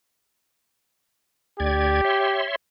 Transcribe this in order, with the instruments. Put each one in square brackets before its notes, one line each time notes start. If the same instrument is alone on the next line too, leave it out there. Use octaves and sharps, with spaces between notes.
[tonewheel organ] D2 D5 G#6 [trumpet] G4
[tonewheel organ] C#5 E5 C6